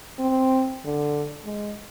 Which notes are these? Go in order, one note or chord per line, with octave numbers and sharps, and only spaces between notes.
C4
D3
G#3